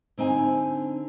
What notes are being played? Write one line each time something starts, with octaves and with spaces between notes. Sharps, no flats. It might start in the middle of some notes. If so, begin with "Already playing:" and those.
D3 C4 D#4 G#5